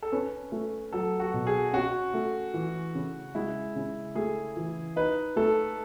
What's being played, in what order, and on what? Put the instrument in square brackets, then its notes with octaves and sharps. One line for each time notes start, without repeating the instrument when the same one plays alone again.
[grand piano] A4
[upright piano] C#4 [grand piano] B4
[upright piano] A3
[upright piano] F#3 [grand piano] A4
[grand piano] F#4
[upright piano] B2
[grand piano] G#4
[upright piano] C#4 [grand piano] F#4
[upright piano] A3
E3
C#3
[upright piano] G#3 [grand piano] E4
[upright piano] C#3
[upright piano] A3 [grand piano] G#4
[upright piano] E3
[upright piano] D#4 [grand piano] B4
[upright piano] A3 [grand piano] A4